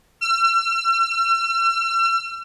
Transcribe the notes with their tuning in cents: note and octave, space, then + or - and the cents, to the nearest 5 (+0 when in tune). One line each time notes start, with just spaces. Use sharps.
E6 +45